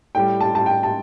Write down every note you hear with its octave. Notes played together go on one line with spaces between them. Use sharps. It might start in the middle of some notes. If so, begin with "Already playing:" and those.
A2 G3 G5
A5
A5
G5
A5